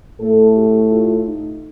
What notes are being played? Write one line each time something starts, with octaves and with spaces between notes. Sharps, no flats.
A2 A3 A4
G4
F4
D#4